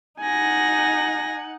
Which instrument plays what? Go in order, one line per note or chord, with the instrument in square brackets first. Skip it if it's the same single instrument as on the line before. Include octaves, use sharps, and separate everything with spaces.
[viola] D#4 F#5 [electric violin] G#5 A#6